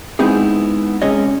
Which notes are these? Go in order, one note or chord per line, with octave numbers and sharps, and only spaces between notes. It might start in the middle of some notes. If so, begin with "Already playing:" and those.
G#3 B3 C4 D#4 E4 G#4
C3 G#3 C#4 G#4 C#5 D#5